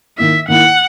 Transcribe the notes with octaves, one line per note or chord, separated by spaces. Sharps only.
D#3 A#3 E4 E5
D#3 A#3 E4 F#5